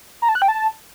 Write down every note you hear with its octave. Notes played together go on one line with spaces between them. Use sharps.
A#5
A5
F#6
G5
A5